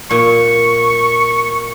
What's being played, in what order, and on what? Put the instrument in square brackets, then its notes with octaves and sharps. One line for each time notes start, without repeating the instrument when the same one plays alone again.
[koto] A#2 [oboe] C#6